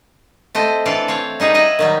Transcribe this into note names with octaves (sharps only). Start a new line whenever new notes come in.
A3 C4 C5 D#5
E3 D4 F4 A4 D5 F5
C4 C#5 F5
G3 D#4 G#4 B4
B4 D#5 E5 F#5
D#3 F#3 G3